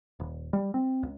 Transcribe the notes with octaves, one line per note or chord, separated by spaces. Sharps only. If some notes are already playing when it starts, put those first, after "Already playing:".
D#1
G3
C4
C#2